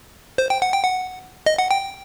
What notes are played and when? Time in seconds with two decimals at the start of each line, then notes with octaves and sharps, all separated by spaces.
0.38 C5
0.50 G5
0.62 F#5
0.73 G5
0.83 F#5
1.46 D#5
1.58 F#5
1.71 G5